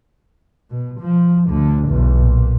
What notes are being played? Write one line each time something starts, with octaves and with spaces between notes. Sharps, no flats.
B2
F3
D2 D3
B1 E2
A#2